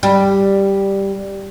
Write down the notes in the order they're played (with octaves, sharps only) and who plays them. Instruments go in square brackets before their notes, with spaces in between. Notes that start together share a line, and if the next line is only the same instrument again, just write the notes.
[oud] G3